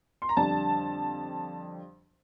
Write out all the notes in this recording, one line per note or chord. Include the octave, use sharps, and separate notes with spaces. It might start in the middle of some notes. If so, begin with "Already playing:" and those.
C6
A#5
F2 D3 G3 A5